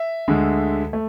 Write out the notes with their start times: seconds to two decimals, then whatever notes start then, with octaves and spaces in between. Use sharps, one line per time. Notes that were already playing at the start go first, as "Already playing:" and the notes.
Already playing: E5
0.28 D2 D3 G#3
0.93 A3